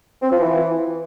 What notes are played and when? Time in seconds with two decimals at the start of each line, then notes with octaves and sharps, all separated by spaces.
0.22 C4
0.31 F3
0.41 E3